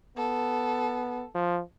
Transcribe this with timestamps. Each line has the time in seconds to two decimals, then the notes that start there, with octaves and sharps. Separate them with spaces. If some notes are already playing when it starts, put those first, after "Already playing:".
0.17 B3 A4
1.35 F3